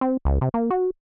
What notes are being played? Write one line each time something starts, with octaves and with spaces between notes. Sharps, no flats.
C4
C#2
C3
A#3
F#4